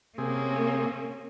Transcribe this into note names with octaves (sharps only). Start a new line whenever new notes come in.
C3 A#3 C#4 G#4